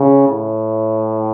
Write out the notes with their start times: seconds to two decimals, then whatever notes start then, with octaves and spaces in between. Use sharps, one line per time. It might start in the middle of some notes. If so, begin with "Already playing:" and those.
Already playing: C#3
0.29 A2